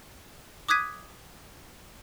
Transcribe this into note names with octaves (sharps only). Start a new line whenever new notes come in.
D6 D#6 F#6 G#6 B6 D#7